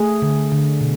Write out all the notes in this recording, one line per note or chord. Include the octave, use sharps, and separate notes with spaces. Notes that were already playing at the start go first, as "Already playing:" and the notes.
Already playing: A3 G#4
D3
D3
B2